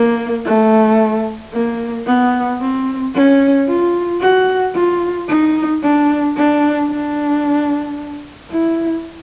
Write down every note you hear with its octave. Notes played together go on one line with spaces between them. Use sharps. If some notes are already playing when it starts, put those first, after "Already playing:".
Already playing: A#3
A3
A#3
B3
C4
C#4
F4
F#4
F4
D#4
D4
D4
D4
E4